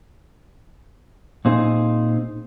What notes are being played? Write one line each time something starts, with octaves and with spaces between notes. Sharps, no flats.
A#2 C4 D#4 G#4